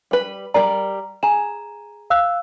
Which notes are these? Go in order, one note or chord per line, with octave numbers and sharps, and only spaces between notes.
G3 B4
G3 A#4 D5 A#5
G#4 A#5 E7
F5 E6 F#6